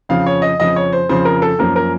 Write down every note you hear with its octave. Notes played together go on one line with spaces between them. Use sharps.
F2 C#3 F3 F5
C#5
D#5
F2 C#3 F3 D#5
C#5
C5
F2 C#3 F3 C5
A#4
A4
F#2 F3 A#3 C#4 A#4
A#4